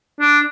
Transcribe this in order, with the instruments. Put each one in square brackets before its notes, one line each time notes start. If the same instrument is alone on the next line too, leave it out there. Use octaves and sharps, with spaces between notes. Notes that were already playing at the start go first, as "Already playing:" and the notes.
[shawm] D4